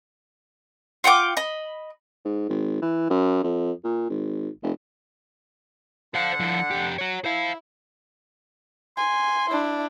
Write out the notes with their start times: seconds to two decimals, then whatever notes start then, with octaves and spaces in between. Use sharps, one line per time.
1.04 F4 F#5 G5 D6
1.37 D#5 B5
2.25 G#2
2.49 G#1
2.82 E3
3.10 F#2
3.43 F2
3.84 A#2
4.10 G#1
4.63 F1
6.15 D3 D4 C5 F5 F#5
6.40 F3 E4
6.71 F2 G4
6.99 F#4 C#5
7.25 E4 C5 F5
8.97 G#5 C6
9.51 D4 E4